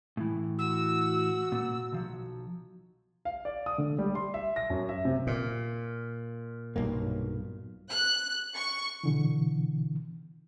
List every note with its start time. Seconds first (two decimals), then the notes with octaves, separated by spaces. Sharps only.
0.17 A2 E3
0.59 F#4 E6
1.52 A#2
1.92 B1 F3 F#3
3.25 F5
3.45 D5
3.66 D#6
3.78 D3
3.98 G3
4.15 C6
4.34 E5
4.56 A#6
4.70 F#2
4.89 E5
5.05 C3
5.27 A#2
6.76 B1 G2 A#3
7.90 F#6
8.54 C#6
9.04 B2 D3 E3